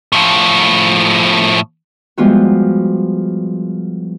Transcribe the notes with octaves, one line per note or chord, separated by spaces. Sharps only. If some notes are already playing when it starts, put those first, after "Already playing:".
A2 F3
F3 G3 G#3 B3 F4 F#4